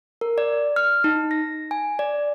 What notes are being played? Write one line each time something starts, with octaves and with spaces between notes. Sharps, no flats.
A#4
D5
F6
D#4
A#6
G#5
D5